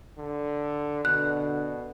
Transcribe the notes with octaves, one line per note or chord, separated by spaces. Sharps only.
D3
B2 D3 F#6